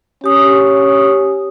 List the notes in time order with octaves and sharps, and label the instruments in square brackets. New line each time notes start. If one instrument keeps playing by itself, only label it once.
[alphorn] C#4 [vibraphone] G4 D#6